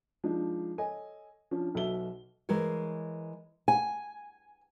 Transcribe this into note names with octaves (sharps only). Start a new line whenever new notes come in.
F3 G#3 D4 D#4
A4 C#5 D#5 G#5
F3 C#4 D4
B1 B2 A4 E5 G7
E3 G#3 A#4 C5 C#5
G#5